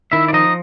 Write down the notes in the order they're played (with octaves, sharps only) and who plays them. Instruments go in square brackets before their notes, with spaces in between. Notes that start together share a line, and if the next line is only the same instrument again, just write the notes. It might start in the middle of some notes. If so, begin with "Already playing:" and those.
[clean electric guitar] D#3 E4 E5
D5
F3 D#4 D#5